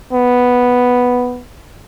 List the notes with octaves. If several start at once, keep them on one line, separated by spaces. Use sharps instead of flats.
B3